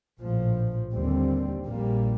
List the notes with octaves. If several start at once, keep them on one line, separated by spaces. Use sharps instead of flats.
A#1 A2 F3
D#2 D3 G3 C4
A#1 A#2 G3 A#3